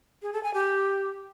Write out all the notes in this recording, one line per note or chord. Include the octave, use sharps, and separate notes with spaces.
G#4
A4
G#5
G4